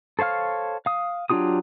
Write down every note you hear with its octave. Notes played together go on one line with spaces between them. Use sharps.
A4 C5 C#5 F5 F6
F5 D#6
F#3 D4 F4 G4 D#6